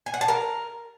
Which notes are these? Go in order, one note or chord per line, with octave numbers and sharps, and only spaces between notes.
G#5
F#5
A5
A#4